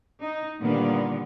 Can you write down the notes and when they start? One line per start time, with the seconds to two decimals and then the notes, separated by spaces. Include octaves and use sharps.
0.21 D#4
0.62 A#2 D3 D#3 G3 A#3 B3